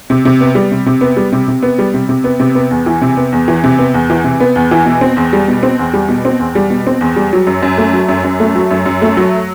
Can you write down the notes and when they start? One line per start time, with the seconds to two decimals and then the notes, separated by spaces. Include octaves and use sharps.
0.10 C3
0.25 C3
0.40 B3
0.55 G3
0.71 C3
0.86 C3
1.01 B3
1.16 G3
1.32 C3
1.48 C3
1.62 B3
1.78 G3
1.94 C3
2.09 C3
2.24 B3
2.40 C3
2.55 B3
2.71 E2
2.86 E3
3.01 C3
3.17 B3
3.32 E2
3.48 E3
3.64 C3
3.79 B3
3.94 E2
4.10 E3
4.24 C3
4.40 B3
4.56 E2
4.71 E3
4.85 B2
5.01 C4
5.17 E2
5.33 G3
5.48 B2
5.63 C4
5.79 E2
5.93 G3
6.08 B2
6.25 C4
6.39 E2
6.55 G3
6.70 B2
6.87 C4
7.01 E2
7.16 G3
7.33 F#3
7.47 F#2
7.63 F#2
7.78 A3
7.93 F#3
8.08 F#2
8.24 F#2
8.40 A3
8.55 F#3
8.71 F#2
8.86 F#2
9.02 A3
9.17 F#3